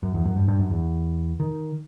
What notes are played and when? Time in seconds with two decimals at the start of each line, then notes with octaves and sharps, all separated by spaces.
0.03 F#2
0.14 E2
0.26 F#2
0.36 G2
0.48 G2
0.59 F#2
0.70 E2
1.40 D#3